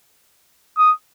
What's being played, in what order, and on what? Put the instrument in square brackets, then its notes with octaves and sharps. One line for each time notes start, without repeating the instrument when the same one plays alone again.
[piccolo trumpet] D#6